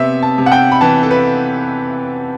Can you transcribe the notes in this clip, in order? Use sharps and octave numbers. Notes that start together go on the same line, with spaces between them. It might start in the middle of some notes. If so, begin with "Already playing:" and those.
Already playing: C3 B3 E5
A5
C3
F#5
G5
B5
E3 A5
A4
B4